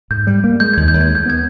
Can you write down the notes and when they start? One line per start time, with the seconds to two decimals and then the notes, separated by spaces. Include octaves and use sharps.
0.10 G#2 G6
0.27 G3
0.44 A#3
0.60 G#3 G6
0.74 D#2 G#6
0.88 G6
0.94 D#2
1.01 G#6
1.09 G#3
1.15 G6
1.26 B3 G#6